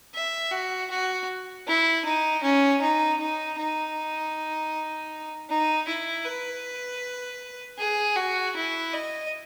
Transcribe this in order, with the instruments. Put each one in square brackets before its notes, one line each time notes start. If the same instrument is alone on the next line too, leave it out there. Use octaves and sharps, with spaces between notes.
[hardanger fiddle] E5
F#4
F#4
E4
D#4
C#4
D#4
D#4
D#4
D#4
E4
B4
G#4
F#4
E4
D#5